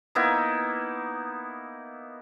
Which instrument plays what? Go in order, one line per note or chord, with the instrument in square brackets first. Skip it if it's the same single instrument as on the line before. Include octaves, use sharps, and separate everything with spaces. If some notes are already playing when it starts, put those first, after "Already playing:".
[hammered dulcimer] A#3 B3 D#4 E4